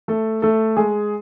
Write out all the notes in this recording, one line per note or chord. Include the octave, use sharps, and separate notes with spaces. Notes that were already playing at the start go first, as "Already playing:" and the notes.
A3 A4
A3 A4
G#3 G#4